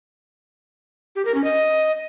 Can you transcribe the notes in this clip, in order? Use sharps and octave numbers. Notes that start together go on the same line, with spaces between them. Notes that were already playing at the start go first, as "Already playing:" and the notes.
G4
A#4
C#4
D#5